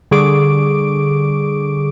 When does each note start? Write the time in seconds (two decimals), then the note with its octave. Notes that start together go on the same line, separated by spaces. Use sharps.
0.11 D3 G3 G#4 C#6 D6 D7